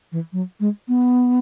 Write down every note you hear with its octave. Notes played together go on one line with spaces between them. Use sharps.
E3
F#3
G#3
B3